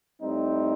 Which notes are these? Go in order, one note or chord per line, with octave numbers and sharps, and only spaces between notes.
A2 G3 C4 D#4